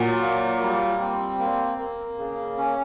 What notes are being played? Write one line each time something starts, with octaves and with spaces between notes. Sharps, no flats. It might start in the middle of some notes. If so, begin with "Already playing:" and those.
Already playing: A#2 F#3
A#3
G3
C4
A#3
A#3
C#3
C#4